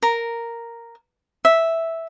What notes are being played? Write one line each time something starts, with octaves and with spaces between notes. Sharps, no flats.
A#4
E5